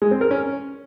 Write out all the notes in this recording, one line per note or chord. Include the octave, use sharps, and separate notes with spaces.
G#3
C4
A#4
C#4